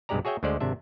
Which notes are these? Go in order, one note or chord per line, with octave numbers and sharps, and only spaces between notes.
B1 G2 G#3 G4 D5 A#5
F#4 G#4 C#5 E5 G5 G#5
D2 D3 G#3 C5 D5
G#1 C3 D4 E5